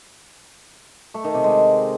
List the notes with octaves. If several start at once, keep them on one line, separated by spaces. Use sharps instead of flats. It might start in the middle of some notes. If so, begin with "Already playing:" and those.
A3
D#3
C3
G#3